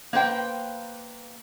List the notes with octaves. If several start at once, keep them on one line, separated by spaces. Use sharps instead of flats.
A#3 B4 C5 G5